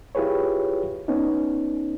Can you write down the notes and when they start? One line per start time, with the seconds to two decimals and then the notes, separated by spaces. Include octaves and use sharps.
0.15 E4 F4 G4 G#4 B4 C#5
1.08 B3 C#4 D#4